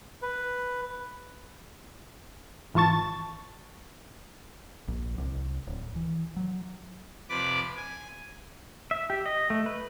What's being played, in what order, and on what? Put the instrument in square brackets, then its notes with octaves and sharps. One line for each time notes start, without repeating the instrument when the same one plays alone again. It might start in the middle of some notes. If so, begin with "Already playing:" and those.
[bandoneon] B4
[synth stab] G#1 E3 F4 A5 C#6 A6
[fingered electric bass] A#1
C2
D1
E3
F#3
[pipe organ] F2 C3 B4 D5 D6
G#5
[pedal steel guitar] E5
G4
D#5
A3
B4